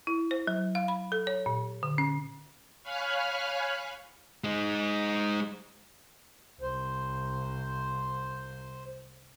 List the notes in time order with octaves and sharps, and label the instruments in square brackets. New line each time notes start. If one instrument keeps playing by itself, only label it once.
[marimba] E4
C5
F#3
F5
B5
A4
C#5
A#2
D3
C#4
[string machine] C#5 F5 G#5 B5 F6 F#6
[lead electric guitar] G#3 D#4
[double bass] C2 [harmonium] C5